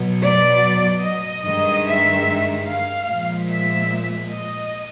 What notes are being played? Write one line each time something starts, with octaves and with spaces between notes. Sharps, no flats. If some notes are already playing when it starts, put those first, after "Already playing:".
Already playing: B2 F#3
D5
D#5
G2 D#3 G#3 D#5
E5
F5
A#2 F3 G#3
E5
D#5